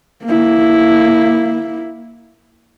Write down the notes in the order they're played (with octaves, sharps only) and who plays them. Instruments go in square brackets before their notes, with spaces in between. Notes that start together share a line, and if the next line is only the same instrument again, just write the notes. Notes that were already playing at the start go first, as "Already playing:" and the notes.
[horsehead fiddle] A#3 E4